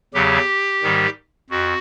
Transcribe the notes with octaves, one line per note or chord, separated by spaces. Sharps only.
E2 C#3 F#3 G4
G#2 D#3 G3
F2 F#4